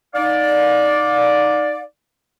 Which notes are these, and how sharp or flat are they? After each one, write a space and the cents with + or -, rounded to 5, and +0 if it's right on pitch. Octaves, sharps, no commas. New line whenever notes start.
D#4 +0 D5 +0 F5 +35